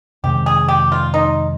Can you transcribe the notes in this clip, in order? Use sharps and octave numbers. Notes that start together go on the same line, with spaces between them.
F2 C3 D#3 G#3 G4
G#4
G4
F4
D#4